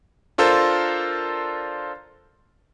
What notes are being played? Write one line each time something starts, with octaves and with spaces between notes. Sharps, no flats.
D4 F4 A4 A#4 C5